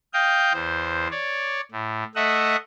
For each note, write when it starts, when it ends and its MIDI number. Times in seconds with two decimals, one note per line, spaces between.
0.13 0.52 75
0.13 0.52 77
0.13 0.52 79
0.13 0.52 91
0.53 1.07 40
0.53 1.07 72
1.11 1.60 73
1.11 1.60 74
1.71 2.03 45
2.15 2.56 57
2.15 2.56 75
2.15 2.56 76
2.15 2.56 78